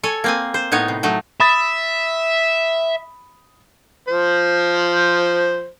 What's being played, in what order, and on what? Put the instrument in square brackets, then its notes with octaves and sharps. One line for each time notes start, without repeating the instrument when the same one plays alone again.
[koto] A4 C#5 G#5
A#3 C4 G#5
C5
A2 B3 D#4 C#5
C3
F#3 A3 D#4
[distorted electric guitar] E5 [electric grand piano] B5 D#6 A6
[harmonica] F3 C5